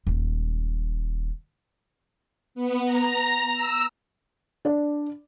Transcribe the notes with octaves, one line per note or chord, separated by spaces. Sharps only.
D#1 G#3
B3
A#5
E6
D4 D5